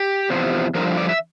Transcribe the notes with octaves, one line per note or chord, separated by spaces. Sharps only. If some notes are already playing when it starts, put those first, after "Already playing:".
Already playing: G4
E2 C3 F3
G2 D3 F3 A#4
D5
E5